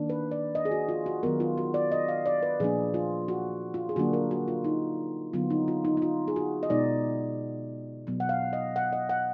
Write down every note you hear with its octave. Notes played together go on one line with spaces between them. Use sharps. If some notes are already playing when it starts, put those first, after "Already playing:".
Already playing: D#3 A#3 D4
B4
D5
D#5
G#4
F#4
F4
F#4
D#3 F#3 B3 A#4
F4
F#4
D5
D#5
F5
D5
B4
A#2 F3 A#3 D4 G#4
F4
F#4
F4
G#4
D3 F#3 A#3 D4 F#4
A#4
F#4
F4
D#4
D3 F#3 B3 F4
D#4
F4
D#4
D#4
F4
G#4
F#4
D#5
B2 G#3 B3 D#4 D5
B2 F#3 B3
F#5
F5
D#5
F#5
D#5
F#5